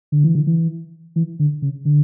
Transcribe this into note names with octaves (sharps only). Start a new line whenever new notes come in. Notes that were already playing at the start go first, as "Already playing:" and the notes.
D3
E3
D3
E3
E3
D3
C#3
D3